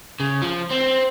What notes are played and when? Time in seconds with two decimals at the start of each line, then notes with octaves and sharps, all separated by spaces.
0.20 C#3
0.42 F3
0.70 C4